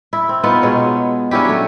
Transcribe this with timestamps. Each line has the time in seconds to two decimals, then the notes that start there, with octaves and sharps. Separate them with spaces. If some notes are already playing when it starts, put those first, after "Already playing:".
0.13 E4
0.29 C4
0.44 B3 D#4 F4
0.63 B2 G#3 C#5
1.31 C#4 D4 E4 G4
1.45 F#3 A3